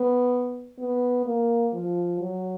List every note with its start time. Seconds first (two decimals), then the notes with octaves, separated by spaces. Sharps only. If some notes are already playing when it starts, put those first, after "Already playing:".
Already playing: B3
0.79 B3
1.26 A#3
1.74 F3
2.21 F#3